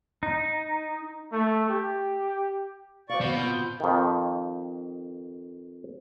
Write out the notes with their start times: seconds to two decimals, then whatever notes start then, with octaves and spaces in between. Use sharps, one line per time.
0.23 D#4
1.32 A3
1.69 G4
3.09 B2 C5 D5 F5 C#6
3.21 B2 F#5 G6
3.35 C4 F4
3.80 F2 D#3